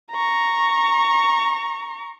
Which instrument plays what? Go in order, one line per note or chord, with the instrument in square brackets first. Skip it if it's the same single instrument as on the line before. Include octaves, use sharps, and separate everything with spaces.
[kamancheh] A#5 C#6